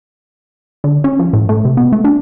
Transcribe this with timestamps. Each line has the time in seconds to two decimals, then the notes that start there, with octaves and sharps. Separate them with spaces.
0.84 D3
1.04 C#4
1.19 F3
1.33 A2
1.49 A3
1.65 C3
1.77 B3
1.92 A3
2.04 D4